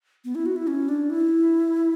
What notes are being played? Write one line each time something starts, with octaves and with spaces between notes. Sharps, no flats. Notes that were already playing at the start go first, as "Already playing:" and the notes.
B3
E4
F#4
E4
C#4
D4
E4